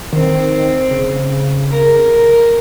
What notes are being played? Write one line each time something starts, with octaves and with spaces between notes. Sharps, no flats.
D#3 C4
C#3
A#4